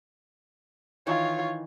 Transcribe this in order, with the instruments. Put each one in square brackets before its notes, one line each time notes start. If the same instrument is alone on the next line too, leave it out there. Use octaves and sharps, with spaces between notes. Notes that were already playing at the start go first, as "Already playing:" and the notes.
[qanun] D#3 E3 D#4 [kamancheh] F4 C#5